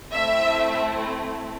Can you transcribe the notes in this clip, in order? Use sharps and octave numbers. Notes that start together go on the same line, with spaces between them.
A3 C4 E4 E5